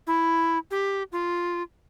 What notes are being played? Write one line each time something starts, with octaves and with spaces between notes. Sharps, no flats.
E4
G4
F4